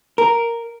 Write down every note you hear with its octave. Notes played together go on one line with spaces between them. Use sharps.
A#4